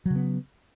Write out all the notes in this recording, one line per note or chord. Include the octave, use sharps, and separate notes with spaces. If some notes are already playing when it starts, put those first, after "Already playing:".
C#3 F#3 B3